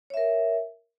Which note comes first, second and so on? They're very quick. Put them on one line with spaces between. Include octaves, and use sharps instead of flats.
C#5 E5 A#4